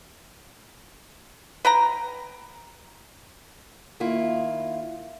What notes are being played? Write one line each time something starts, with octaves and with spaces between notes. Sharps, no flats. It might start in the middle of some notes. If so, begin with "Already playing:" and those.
B4 G5 A#5
D#3 A#3 E4 F4